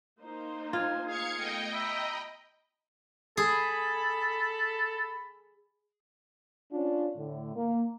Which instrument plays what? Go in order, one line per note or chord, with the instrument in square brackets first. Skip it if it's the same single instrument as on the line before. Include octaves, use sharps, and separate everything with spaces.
[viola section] A#3 D#4 C5
[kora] F4 [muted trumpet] G#5
[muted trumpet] G#4 [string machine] F5 G#6 C#7
[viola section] A3 B3 [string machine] D#5 G5
[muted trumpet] E5 [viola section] A#5 B5
[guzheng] G#4 [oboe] A4 [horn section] B5
[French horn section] C#4 D4 F4
A2 D3
A#3